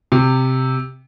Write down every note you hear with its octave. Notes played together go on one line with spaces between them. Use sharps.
C3